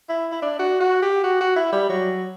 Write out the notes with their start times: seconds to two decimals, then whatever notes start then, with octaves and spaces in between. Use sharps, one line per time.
0.09 E4
0.32 E4
0.42 D4
0.59 F#4
0.80 F#4
1.02 G4
1.24 F#4
1.41 F#4
1.56 E4
1.73 G3
1.89 F#3